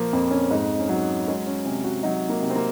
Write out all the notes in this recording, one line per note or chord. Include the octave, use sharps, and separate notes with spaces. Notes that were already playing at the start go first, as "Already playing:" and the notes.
Already playing: A#2 F3 A#3
F2 C4
C#4
G#2 D#4
C#4
F#3 D#4
G#3 C#4
C#4
C3 C#4
F#4
F#3 D#4
A#3
C3
C4
A#3